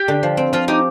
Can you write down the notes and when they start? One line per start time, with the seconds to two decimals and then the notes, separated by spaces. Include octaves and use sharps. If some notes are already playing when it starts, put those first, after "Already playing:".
Already playing: G4
0.08 D3
0.23 F3
0.37 C4
0.53 F3 F4
0.68 D#4 G4